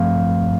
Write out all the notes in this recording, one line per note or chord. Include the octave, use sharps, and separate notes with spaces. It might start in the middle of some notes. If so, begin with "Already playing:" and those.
Already playing: G2 F3 A3 C4 F5